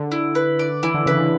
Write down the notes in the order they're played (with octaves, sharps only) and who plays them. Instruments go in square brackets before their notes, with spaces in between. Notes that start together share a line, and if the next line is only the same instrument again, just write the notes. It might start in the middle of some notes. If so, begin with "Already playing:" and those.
Already playing: [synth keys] D3
[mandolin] E4
B4
D5
[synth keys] E3 [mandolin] E4
[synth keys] D3
[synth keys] C#3 [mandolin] B4
[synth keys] D3